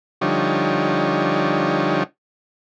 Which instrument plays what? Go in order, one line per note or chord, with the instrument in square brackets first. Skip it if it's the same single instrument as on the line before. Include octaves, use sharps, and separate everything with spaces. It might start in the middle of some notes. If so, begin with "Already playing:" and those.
[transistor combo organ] D3 F3 G3 D#4 C#5